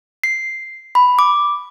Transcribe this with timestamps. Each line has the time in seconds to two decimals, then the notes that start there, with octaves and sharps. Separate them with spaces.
0.24 C7
0.95 B5
1.19 D6